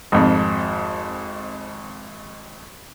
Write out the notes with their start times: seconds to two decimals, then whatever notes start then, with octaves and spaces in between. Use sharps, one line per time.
0.12 G#1 F2